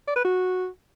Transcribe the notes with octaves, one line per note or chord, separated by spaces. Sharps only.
D5
B4
F#4